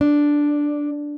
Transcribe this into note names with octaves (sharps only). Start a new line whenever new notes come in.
D4